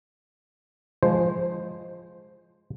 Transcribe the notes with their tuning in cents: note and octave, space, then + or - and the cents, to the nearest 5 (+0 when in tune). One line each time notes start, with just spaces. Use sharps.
F3 +0 G#3 +0 C5 +0